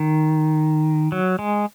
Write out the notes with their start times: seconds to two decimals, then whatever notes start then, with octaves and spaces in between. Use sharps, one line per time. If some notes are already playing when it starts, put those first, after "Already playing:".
Already playing: D#3
1.12 F#3
1.39 G#3